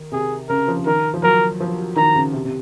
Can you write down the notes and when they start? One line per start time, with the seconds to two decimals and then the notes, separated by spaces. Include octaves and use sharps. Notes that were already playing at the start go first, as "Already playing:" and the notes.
Already playing: D#3
0.12 C3 G#4
0.49 C#3 A#4
0.68 F3
0.86 D#3 A#4
1.14 F3
1.23 F#3 A#4
1.60 F3
1.96 D#3 A#5
2.15 C#3
2.33 C3
2.45 C3